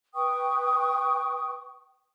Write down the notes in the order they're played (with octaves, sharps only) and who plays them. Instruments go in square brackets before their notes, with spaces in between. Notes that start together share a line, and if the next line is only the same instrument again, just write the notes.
[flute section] B4 G5 C#6 D#6